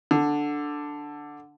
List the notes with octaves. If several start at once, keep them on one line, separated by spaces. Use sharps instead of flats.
D3